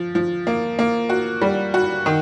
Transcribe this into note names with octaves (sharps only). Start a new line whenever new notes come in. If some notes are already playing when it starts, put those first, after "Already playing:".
Already playing: F3
F3
A#3
A#3
F#4
G3
F#4
D#3